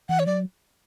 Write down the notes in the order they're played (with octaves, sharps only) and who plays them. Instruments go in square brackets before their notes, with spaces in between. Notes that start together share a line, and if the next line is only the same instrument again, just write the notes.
[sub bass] E3 [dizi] F#5
[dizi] C#5
[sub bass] F#3 [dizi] D5